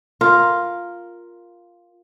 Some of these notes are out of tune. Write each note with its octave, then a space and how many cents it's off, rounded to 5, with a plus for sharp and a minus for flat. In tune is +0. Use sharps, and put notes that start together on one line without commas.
F4 +0 A#4 +0